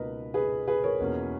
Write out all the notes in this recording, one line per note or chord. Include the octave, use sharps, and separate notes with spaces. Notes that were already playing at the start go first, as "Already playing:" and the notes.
Already playing: C#2 B2 A#3 D#4 A#4 B4 D#5
G#4 B4
G#4 B4
A#4 C#5
E2 B2 A#3 C#4